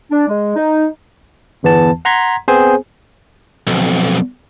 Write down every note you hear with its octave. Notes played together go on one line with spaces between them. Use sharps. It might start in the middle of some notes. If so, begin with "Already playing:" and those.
D4
G#3
D#4
G1 E2 E3 B3 A5
F#5 A#5 C6 G#6 B6
B3 C4 G#4 C5 G#5
B1 F2